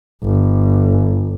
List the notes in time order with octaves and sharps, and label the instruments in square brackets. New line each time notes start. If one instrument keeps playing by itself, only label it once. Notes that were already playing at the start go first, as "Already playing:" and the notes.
[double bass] G1